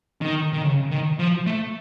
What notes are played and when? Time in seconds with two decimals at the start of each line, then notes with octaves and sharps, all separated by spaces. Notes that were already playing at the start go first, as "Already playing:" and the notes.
0.21 D#3
0.53 D#3
0.64 C#3
0.91 D#3
1.19 F3
1.46 A3